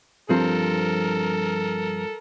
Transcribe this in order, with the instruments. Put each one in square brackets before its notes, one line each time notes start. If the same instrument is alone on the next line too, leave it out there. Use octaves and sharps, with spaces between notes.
[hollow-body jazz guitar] G2 F3 C4 [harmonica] A4 A#4